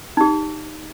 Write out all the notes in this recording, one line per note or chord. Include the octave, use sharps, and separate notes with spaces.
D#4 G4